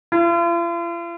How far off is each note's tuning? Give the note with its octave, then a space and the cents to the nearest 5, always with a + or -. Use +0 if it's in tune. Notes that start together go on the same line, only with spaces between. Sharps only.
F4 -45